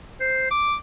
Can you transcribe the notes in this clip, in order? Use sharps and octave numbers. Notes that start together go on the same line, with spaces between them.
C5
D6